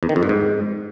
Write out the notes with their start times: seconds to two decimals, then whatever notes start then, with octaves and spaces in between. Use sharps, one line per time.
0.03 E2
0.09 D#3
0.16 F2
0.23 G2
0.29 G#2